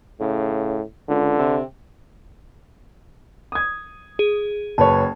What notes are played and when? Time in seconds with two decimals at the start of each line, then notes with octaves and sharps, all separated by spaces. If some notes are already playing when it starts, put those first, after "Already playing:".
0.20 A2 C#3
1.09 C#2 D3
1.39 C3
3.52 D#6 G#6
4.19 G#4
4.78 F#1 B4 C#5 A5